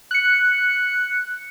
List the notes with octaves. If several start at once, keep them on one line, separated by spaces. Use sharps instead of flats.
F#6 C#7